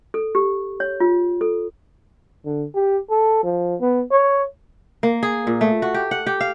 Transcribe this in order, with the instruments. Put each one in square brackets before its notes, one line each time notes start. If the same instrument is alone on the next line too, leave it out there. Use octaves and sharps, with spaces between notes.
[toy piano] A4
G4
C#5
F4
A4
[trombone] D3
G4
A4
F3
B3
C#5
[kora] A#3
G#4
A#2
A3
F#4
G4
F#5
G4
F5